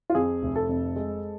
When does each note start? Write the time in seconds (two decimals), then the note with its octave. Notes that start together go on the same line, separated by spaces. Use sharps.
0.10 F4
0.15 F2 G#4
0.42 F1
0.56 A4
0.69 F2
0.96 G#3